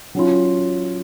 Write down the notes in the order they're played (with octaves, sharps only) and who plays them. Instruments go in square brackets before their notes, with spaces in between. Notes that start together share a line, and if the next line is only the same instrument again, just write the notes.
[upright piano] F#3 C#4 F4